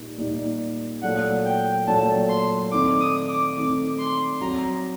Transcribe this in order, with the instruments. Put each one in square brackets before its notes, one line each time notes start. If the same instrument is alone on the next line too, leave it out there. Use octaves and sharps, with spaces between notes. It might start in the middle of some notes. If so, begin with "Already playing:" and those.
Already playing: [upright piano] A#2 G3 A#3 D#4
A#2 G3 A#3 D#4 G4
[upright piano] A#2 F#3 A3 [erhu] F#5
[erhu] G5
[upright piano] A#2 F#3 A3 [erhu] A5
[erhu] C6
[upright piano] D#3 A3 C4 D#4 [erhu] D6
[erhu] D#6
D6
[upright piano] D#3 A3 C4 D#4 [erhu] D6
[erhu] C6
[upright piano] F#3 C4 F#4 [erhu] A#5